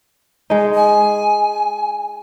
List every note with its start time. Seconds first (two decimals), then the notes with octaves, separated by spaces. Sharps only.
0.50 G#3 D#4
0.75 G#5